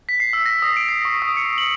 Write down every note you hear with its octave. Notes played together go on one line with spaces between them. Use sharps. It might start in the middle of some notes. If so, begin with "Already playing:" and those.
B6
C7
E6
A#6
D#6
D7
C7
C#6
D#6
C#7
F#7